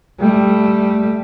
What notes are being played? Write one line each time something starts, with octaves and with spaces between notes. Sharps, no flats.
G3 A3